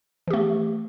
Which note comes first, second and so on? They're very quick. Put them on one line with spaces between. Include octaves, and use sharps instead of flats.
E3 G4 A3